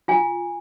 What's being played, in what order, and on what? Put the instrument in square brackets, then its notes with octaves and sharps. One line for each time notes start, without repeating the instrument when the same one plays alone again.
[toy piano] F4 G#5